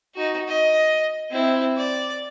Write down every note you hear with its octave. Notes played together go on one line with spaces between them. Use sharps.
D#4 F#4
D#5
C4 E4
D5